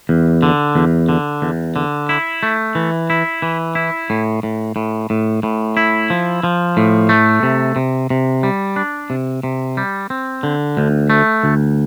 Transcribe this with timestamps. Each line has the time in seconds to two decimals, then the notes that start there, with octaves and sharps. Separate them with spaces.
0.09 E2
0.43 D3
0.75 E2
1.09 D3
1.42 E2
1.76 D3
2.09 E4
2.43 A3
2.75 E3
3.10 E4
3.42 E3
3.75 E4
4.10 A2
4.43 A2
4.76 A2
5.10 A2
5.43 A2
5.77 E4
6.10 F3
6.43 F3
6.77 A2
7.09 A3
7.43 C3
7.76 C3
8.10 C3
8.43 G3
8.76 D4
9.10 C3
9.43 C3
9.77 G3
10.10 C4
10.43 D3
10.77 D2
11.10 A3
11.44 D2